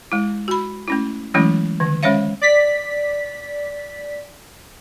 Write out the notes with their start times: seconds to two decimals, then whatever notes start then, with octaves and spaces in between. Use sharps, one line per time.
0.12 G#3 E4
0.48 F#4 B5
0.88 A3 C#4 E4
1.34 E3 F#3 G#3 A3 C#4 E4
1.80 D3 D#3
2.03 G#3 C#4 C5 C#5 E5 F5
2.41 D5 B6